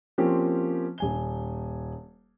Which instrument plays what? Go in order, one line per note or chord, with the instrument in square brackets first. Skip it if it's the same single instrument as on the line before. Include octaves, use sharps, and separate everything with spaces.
[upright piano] F3 A#3 C4 C#4 F4 G4
D#1 G#5 G7